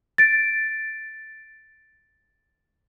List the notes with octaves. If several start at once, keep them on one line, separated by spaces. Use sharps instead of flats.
A6 D7